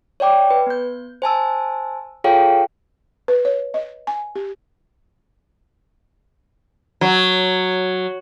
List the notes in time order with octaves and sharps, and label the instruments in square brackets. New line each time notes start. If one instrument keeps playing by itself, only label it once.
[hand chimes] C#5 D5 G5 D6
B4
B3 G6
C5 G#5 A5 E6
F4 G#4 A4 C#5 F5 G5
[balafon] B4
C#5
D#5
G#5
G4
[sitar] F#3